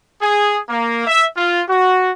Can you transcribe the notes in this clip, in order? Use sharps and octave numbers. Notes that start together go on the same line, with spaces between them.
G#4
A#3
E5
F4
F#4